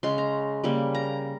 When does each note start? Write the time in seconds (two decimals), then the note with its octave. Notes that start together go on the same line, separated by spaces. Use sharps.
0.03 C#3 G#3 C#4 C6
0.18 A#5
0.64 C#3 G3 A#3
0.95 A#5